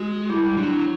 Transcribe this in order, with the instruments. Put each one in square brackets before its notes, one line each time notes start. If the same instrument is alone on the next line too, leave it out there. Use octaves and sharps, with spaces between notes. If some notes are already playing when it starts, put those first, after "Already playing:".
Already playing: [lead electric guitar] G#3 [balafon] F#4
[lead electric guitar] G3 [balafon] E4
[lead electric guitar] F#3 [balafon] D4